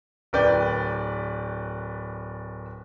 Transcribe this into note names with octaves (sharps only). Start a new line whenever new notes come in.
D1 A#4 B4 D5 G5 G6